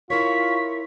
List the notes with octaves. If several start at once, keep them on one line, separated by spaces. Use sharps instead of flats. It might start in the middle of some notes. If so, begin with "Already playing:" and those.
E4 F4 A#4 C#5 C#6 B6